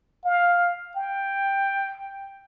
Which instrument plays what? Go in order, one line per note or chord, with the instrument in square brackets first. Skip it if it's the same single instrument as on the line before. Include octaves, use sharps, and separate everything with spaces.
[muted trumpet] F5
G5